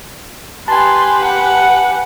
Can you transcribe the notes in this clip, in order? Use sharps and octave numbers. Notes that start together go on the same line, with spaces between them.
G4 B4 G#5 A5 C6
F#5